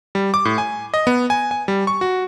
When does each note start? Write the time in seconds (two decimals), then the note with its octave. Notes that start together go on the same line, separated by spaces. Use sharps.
0.15 G3
0.34 D6
0.45 A2
0.58 G#5
0.94 D#5
1.07 B3
1.30 G#5
1.51 G#5
1.68 G3
1.87 C#6
2.01 F#4